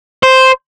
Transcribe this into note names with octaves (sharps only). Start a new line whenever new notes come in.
C5